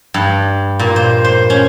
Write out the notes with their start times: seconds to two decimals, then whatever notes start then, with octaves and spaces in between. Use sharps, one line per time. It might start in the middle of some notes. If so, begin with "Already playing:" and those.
0.14 G2
0.79 A#2
0.96 C5
1.24 C5
1.50 C#4